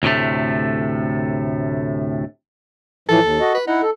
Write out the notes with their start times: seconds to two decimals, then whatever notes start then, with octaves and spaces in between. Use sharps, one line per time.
0.03 D2 A2 C3 A3
3.09 A2 E3 F3 A4
3.23 D#2
3.40 F#4 D#5
3.55 B4
3.67 D#4 E4 F#5
3.82 A4